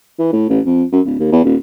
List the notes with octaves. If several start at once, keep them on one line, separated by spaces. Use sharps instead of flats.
E3
A2
A1
F2
F#2
D1
D#2
E2
D#1